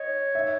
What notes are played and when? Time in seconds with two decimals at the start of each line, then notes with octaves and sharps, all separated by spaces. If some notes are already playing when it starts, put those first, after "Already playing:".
Already playing: C#5 D#5
0.35 E5